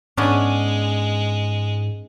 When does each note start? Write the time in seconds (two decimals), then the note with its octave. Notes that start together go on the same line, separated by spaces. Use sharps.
0.17 G#2 G#3 B3 C#4 D4